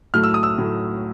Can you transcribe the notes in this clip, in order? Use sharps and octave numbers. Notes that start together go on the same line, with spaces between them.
A2 F#3 A3 F6
E6
D#6
E6
A2 F#3 A3